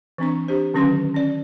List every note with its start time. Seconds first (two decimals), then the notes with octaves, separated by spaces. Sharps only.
0.18 E3 C4 D4 C#6
0.48 D4 G4 C5
0.74 D3 D#3 F#3 C#4 B4 C6
1.14 C#4 D5